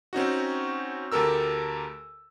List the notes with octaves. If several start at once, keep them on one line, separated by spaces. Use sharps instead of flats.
C4 C#4 D#4 F#4
D2 G4 A4 A#4 E6